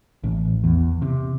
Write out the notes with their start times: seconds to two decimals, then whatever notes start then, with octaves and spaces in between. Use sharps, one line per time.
0.24 A1
0.64 E2
1.02 C3